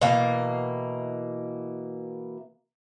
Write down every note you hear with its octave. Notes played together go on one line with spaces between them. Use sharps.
B2 E3 A#3